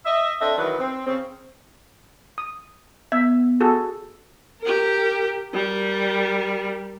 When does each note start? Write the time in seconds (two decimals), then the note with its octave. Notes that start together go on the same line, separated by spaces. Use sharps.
0.06 D#5 E5
0.41 C4 D4 A4 D#5 E5
0.58 D#3 E3 F#3 B4
0.79 C4
1.06 C#3 C4
2.38 D#6
3.12 B3 E5
3.60 F#4 G#4 A4
4.61 G4 A#4
5.54 G3 A#4